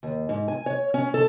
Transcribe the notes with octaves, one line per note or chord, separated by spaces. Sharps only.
D#2
G#2
G#5
C#5
C#4
A4